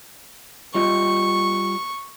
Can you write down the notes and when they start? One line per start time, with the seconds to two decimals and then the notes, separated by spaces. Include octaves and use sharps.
0.75 G3 F4 D#5 C#6